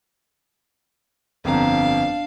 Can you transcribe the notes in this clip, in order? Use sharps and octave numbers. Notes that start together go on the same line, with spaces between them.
G1 F2 D4 F5 A#5